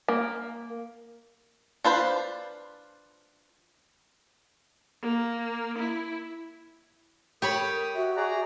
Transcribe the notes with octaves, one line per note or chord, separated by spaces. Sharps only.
A#3
D4 F4 B4 C5
A#3
E4
G4 A#4 C#5 B5 D#6
F#4 E5
G#4 D5 A#5